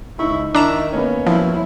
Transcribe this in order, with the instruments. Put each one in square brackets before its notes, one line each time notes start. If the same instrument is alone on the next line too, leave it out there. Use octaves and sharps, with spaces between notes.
[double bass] C#2 [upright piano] D#4 C#6 [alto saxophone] E4
[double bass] D#3 [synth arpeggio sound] D4 A#5 E7 [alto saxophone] E4
[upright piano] A#3 B3 [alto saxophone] C#4
[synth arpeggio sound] F3 [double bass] F#3 E4